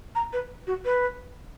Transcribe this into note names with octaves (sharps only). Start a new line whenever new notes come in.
A#5
B4
F#4
B4